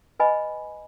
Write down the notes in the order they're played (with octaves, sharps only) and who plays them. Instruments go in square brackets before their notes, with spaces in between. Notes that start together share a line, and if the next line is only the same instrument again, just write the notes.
[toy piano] B4 D#5 G#5 B5